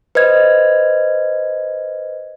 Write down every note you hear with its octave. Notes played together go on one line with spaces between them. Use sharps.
B4 C5 D#5 G#6